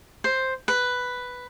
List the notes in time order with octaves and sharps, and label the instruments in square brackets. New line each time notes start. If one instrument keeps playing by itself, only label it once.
[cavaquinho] C5
B4